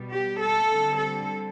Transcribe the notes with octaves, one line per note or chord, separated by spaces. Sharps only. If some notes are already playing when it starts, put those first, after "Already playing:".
Already playing: B2 G3 B3
G4
A4
D3 G3 C4
A4